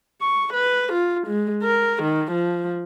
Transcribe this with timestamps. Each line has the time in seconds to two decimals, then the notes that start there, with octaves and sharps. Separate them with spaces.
0.22 C#6
0.54 B4
0.93 F4
1.27 G#3
1.64 A#4
2.03 D#3
2.32 F3